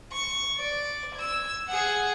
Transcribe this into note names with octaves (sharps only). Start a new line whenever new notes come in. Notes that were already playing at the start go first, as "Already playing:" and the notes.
C#6
D5
E6 G#6
G#4 F#5